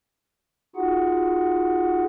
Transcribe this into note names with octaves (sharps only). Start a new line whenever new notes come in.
D#4 F4 F#4 G#4 F#5